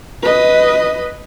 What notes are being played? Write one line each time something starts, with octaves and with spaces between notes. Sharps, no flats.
B4 D#5